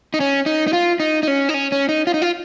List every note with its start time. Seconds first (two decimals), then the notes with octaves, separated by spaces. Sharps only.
0.14 D#4
0.20 C#4
0.46 D#4
0.68 D#4
0.73 F4
1.00 D#4
1.23 D#4
1.28 C#4
1.49 D#4
1.54 C#4
1.72 C#4
1.89 D#4
2.07 F4
2.14 D#4
2.22 F4